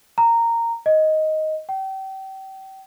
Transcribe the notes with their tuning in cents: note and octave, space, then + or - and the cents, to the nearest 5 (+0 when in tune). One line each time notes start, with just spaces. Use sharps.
A#5 -10
D#5 +5
G5 -35